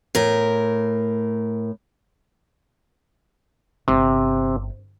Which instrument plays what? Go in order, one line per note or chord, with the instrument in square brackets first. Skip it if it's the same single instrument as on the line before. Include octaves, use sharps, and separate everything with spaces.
[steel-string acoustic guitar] A2 A#4
[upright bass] G1 [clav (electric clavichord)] C3